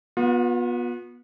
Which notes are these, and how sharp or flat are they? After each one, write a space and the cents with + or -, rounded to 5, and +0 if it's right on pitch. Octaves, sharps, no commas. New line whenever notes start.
B3 -20 F4 +40